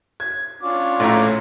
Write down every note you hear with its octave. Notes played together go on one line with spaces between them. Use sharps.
G#6
C#4 D4 F4 D6
A#1 A2 E4 A#5